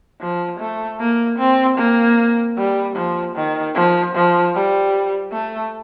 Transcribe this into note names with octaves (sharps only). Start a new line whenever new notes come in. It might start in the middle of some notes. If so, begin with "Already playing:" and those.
F3
A3
A#3
C4
A#3
G3
F3
D#3
F3
F3
G3
A3